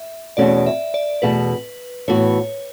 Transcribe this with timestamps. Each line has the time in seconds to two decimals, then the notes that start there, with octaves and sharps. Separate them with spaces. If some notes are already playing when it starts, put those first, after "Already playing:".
Already playing: E5
0.37 E2 B2 A3 C#4 F#4 D5
0.66 E5
0.94 D5
1.22 E2 B2 A3 B4
2.08 A2 E3 B3 F#4 C#5